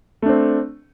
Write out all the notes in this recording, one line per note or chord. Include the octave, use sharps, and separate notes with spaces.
A3 C4 D4